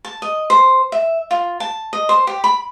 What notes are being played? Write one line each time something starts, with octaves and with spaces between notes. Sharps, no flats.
A5
D#5
C5
E5
F4
A5
D#5
C5
G4
B5